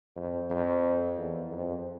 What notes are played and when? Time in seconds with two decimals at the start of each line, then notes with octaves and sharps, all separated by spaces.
0.16 F2
0.50 F2
1.18 E2
1.51 F2